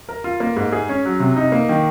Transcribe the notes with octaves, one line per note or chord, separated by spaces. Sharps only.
A#4
F4
A#3
G#2
G#4
C#4
F#3
C3
D#4
A#3
D#3